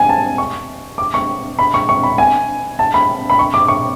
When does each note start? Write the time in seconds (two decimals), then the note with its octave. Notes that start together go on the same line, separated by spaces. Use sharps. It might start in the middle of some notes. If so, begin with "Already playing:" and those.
Already playing: G#5
0.09 A5
0.38 C#6
0.98 D6
1.14 C#6
1.59 B5
1.74 C#6
1.89 C#6
2.03 B5
2.18 G#5
2.79 A5
2.94 B5
3.30 B5
3.39 C#6
3.54 D6
3.68 C#6